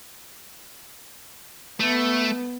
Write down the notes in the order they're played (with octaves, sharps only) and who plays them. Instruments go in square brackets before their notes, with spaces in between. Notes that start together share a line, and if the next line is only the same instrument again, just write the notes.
[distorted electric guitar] A3 [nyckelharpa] B3